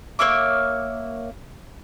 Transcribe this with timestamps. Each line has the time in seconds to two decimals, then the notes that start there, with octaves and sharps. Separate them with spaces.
0.19 A#3 C#5 E5 D6